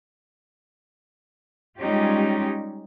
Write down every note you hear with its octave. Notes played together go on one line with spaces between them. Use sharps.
G3 G#3 C#4 D#4 F4 G4